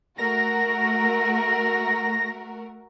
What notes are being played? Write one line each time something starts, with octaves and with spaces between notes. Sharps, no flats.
A3 F#4 A#4 A#6